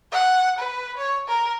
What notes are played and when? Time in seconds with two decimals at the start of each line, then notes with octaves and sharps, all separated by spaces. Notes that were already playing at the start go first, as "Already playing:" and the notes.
0.12 F#5
0.59 B4
0.98 C#5
1.28 A#4